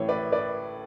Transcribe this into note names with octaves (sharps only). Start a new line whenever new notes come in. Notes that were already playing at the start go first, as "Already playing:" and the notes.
Already playing: A1 A2 E3 C#5
B4 D5
B4 D5